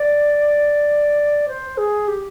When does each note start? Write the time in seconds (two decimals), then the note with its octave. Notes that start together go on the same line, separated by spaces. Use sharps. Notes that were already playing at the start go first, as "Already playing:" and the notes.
Already playing: D5
1.48 C5
1.77 G#4
2.08 G4